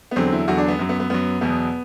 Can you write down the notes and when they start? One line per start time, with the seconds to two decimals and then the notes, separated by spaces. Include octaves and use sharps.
0.11 B3
0.16 E2 D3 F#3 C4
0.32 E4
0.48 E2 D3 F#3 F#4
0.58 D4
0.68 B3
0.79 F#2 F#3
0.89 B3
1.00 B3
1.10 F#2 F#3 B3
1.41 E2 B2 F#3 B3